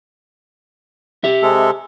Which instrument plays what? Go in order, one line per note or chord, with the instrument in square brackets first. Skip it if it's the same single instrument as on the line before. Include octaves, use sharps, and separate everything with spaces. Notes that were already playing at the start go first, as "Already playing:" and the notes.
[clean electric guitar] G4 E5
[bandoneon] C3 G#3 A4